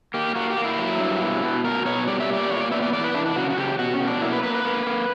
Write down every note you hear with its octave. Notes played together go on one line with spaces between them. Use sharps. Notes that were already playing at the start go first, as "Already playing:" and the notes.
A#3 G4
A#3 F#4
G4
A#3
E4
F#3
G2
B2
B2
B2 A#4
B2 C#5
G3 D5
E5
A#2 D5
A#2 C#5
D5
B3 E5
D5
E3 D5
B4
E3 D4
D4
C#3 F#4
F#4
C#3 G4
B2 F#4
C#4
B2
D4
A#3 E4
B4
A#3 B4
B4
A#3
A#3